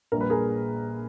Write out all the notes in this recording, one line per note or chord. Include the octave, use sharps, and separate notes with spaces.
A#1 A#2 G3 A#4
B4
G#4 A#4